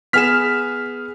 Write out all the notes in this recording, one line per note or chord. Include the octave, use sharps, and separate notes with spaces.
B3 G#4 F6 B6 E7